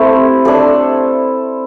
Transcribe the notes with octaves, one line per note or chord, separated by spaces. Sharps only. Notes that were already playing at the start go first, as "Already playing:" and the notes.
Already playing: A3 C4 E4 G4 A4
A3 D4 A4